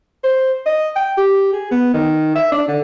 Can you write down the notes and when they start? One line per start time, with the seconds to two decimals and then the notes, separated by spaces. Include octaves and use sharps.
0.24 C5
0.66 D#5
0.96 G5
1.17 G4
1.53 G#4
1.71 B3
1.94 D#3
2.35 E5
2.52 D4
2.68 D3